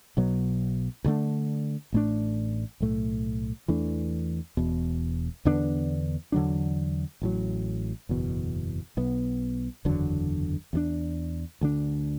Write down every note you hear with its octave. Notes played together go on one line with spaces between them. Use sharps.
B1 B2 F#3 B3
D2 D3 A3 D4
A1 A2 A3 D4
B1 A2 A3
E2 E3 A3 D4
E1 E2 B2
E2 D3 B3 D4
E2 D3 F#3 D4
A1 A2 F#3
F#1 E2 B2
B1 B2 B3
F#1 E2 D3 F#3
E2 E3 D4
D2 D3 B3 D4